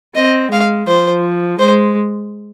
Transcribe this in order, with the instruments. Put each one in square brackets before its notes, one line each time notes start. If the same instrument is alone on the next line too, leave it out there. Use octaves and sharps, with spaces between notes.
[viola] C4 [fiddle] D#5
[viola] G#3 [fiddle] F5
[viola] F3 [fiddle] C5
[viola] G#3 [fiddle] C5